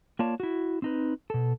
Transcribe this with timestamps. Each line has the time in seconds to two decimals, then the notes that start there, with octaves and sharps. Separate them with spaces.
0.19 A#3 F4 C#5 D5 A5
0.40 E4 F#4
0.82 C4 D#4 B4
1.30 B2 A4